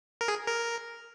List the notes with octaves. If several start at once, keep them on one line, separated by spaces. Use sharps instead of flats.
A#4
G#4
A#4